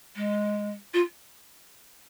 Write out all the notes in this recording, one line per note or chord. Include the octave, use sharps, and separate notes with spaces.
G#3
F4